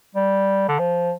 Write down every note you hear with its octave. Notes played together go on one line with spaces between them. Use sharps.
G3
D3
F3